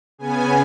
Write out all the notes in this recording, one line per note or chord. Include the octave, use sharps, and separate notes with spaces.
C#3 B3 G#5